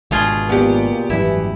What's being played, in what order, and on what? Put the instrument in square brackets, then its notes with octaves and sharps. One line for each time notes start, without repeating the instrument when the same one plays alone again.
[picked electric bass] G#1 D3 [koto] B2 F4 G#4
[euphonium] A#2 [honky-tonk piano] B3 G4
[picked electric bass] G#1 F#2 G3 [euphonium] E3 [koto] E4